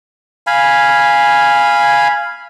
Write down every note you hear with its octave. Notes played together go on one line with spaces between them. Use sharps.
F5 G#5 B5